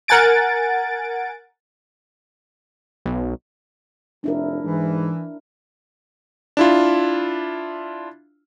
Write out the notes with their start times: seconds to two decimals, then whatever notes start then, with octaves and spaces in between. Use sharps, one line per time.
0.08 A#4 F#5 G#5 A6 D7
3.06 B1
4.24 F1 D4 E4 A#4
4.64 G#2 E3
6.57 D4 E4 F4